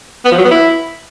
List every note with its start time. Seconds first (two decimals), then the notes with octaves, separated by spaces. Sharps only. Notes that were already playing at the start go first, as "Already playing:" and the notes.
0.25 B3
0.31 F3
0.38 F#3
0.44 B3
0.51 E4